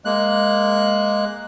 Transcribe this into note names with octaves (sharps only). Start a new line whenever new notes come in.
G#3 A#3 F#6